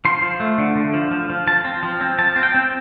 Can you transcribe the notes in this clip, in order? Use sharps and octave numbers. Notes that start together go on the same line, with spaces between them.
F3 C6
F3
A3
D3
D3
F3
F3
F3
F3 A5
C4
F3
C4
F3 A5
C4
G5
C4